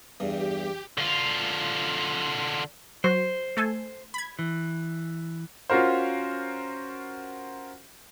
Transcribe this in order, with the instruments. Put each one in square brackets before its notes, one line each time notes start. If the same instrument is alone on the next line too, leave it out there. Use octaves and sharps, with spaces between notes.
[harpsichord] E2 G2 [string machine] G4
[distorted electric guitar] D3 F4
[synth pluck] F#3 F#4 [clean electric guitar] C5
[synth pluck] A3 A4 G#5
B5 G#6
[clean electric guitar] E3
[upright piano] C#4 F4 F#4 A#4 C5